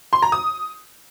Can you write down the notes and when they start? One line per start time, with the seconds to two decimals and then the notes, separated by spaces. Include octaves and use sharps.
0.13 C6
0.22 A#5
0.32 D#6